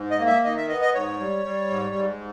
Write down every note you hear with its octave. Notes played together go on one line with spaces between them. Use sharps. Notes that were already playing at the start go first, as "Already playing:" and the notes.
Already playing: G#2
D#5
A#3
E5
D#3 D#5
E5
B3 D#5
D#5
G#2 C#5
G3
G3
G#2
G#2